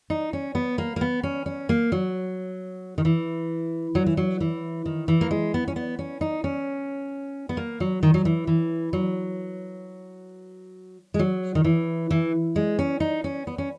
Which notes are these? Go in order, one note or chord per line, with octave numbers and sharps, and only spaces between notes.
D#4
C#4
B3
A#3
A#3
B3
C#4
C#4
A#3
F#3
D#3
E3
F#3
E3
F#3
E3
D#3
E3
A#3
G#3
B3
C#4
B3
C#4
D#4
C#4
B3
A#3
F#3
D#3
F#3
E3
E3
F#3
G#3
F#3
D#3
E3
E3
G#3
C#4
D#4
C#4
B3
C#4